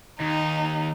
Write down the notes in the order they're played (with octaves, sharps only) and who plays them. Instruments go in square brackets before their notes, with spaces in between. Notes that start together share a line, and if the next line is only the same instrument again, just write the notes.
[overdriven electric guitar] D#2 [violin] D#4